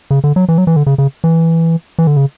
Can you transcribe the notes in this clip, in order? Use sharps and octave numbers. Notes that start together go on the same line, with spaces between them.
C#3
D3
F#3
E3
F#3
E3
D3
C#3
C#3
E3
E3
D3
C#3